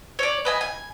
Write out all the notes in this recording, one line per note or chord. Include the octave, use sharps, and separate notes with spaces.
C#5 D5
B4 D#5 G#5
G#5